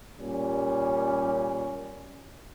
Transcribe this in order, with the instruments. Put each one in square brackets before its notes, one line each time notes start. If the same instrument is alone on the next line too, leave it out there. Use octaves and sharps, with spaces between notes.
[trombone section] A#2 G3 C#4